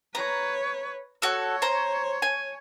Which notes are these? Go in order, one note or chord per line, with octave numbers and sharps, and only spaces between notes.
B4 C#5 A#5
F#4 A4 C#5
C5 A#5
G#5